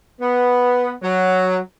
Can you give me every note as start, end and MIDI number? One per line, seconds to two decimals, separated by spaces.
0.21 0.90 59
1.03 1.57 54